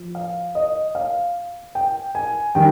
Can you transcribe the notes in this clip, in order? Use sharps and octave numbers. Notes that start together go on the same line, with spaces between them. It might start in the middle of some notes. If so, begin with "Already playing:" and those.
Already playing: F3
F5
D#5
F5
G5
G#5
D#3 G3 G5